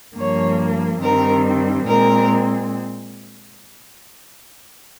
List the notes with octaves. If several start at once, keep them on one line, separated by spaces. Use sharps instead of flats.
G2 F3 A#3 C#5
G2 D#3 G3 C4 A#4
A#2 G#3 C4 A#4